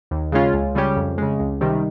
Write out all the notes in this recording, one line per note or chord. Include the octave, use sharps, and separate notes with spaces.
D#2
C#3 G#3 C#4 F4
C#2
C#3 G3 C#4 G4
F2
C#3 G#3
C#2
C3 D#3 G3